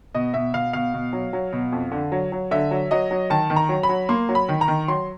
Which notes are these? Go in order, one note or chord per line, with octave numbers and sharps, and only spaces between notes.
B2 D#5
B2 E5
B2 F5
B2 F5
B2
F#3
F#3
B2
F2
D3
F#3
F#3
D3 E5
F#3
F#3 D#5
F#3
D#3 A5
D#3
A#5
F#3
B5
F#3
A#3 C6
F#3
B5
D#3
A#5
D#3
F#3 C6